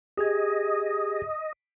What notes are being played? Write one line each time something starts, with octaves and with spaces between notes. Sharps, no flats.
G4 G#4 D#5 G#6